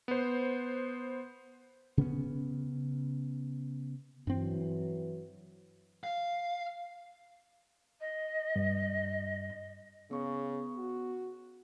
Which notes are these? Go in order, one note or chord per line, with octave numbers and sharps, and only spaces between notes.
B3 C5
C#3 B3 C#4
G2 E3 F#3 C4
F5
D#5
G2
C#3 B3 C#6
F#4